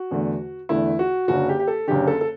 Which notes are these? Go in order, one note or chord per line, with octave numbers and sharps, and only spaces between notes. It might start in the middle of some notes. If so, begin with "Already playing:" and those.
Already playing: F#4
E2 D3 A3
E2 D3 A3 E4
F#4
F#1 F#2 D3 F#4
G4
G4
A4
F#1 F#2 D3 G4
A4
A4